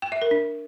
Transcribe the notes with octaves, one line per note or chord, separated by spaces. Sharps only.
G5
E5
A#4
D4